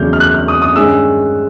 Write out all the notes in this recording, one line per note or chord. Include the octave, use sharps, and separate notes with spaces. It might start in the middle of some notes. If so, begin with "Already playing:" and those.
Already playing: E2 C#3 F#3 A3 D4 F6 G6
F6
F#6
F6
D#6
D#6
G2 D#3 G#3 C#4 E6